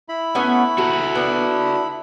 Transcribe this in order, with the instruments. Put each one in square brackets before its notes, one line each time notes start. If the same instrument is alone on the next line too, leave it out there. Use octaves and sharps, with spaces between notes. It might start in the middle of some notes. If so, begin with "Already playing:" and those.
[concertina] E4 B5
[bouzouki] A3 B3 C#4
[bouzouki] F#3 [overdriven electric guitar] F#4 A4
[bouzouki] B3 D4